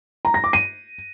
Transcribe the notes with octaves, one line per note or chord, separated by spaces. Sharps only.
A#5
A#6
D6
D#7